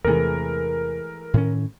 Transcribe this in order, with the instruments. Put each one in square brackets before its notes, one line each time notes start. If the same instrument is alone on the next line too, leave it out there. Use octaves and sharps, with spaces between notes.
[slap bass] E2 C3 [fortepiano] E3 G#3 A3 [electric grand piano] A#4
[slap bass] A2 D#3 C#4